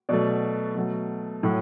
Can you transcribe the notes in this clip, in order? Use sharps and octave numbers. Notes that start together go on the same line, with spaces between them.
B2 F#3 A3 D5
B2 F#3 A3
A2 F#3 A3